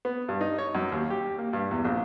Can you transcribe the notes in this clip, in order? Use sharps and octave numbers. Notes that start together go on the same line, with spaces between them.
B3
G2
D#4
C#5
F#2
D#2
G4
A#3
G2
E2
A#1